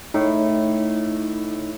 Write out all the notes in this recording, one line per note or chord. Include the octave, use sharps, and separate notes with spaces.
A2 D#4